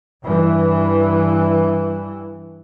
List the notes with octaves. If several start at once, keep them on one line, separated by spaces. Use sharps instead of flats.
G2 E3